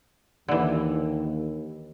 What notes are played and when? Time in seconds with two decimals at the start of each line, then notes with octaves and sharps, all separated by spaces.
0.48 D#2 D3 E3